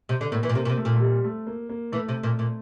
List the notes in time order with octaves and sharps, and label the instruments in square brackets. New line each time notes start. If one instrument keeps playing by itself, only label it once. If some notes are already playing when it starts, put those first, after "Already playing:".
[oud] C3
D3
[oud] A2 [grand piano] A#3
[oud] E3
A#2
[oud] C3 [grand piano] A#3
[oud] A#2
C3
[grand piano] A3
[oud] A#2
[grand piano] A3
G3
A3
A#3
A#3
[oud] E3 [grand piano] A3
[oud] C3
A#2
A#2